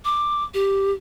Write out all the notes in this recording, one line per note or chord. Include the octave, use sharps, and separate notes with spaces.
D6
G4